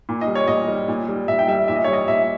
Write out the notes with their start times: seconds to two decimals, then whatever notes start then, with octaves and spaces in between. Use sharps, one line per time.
0.09 A#2
0.21 D#5
0.28 G3
0.35 C#5
0.48 A#2 D#5
0.68 G3
0.88 A#2
1.08 G3
1.28 A#2 E5
1.39 G5
1.48 G3 E5
1.68 A#2 E5
1.76 D#5
1.84 C#5
1.88 G3
1.93 D#5
2.08 A#2 E5